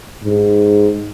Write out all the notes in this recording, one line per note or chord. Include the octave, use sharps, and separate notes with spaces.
G#2